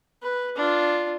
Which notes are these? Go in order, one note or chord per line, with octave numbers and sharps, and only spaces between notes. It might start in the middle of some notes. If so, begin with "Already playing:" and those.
B4
D4 F4